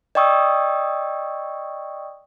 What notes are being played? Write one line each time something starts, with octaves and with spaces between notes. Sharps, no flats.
D5 D#5 G5 C#6 D#6 E6